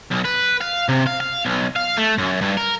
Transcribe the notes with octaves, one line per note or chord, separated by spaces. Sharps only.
B1
B4
F5
C3
F5
F5
B1
F5
A3
F#2
G2
A#4